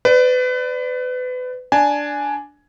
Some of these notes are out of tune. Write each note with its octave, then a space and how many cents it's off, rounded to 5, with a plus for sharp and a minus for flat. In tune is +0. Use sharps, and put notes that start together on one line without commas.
B4 +30 D5 +0
D4 +0 G#5 +10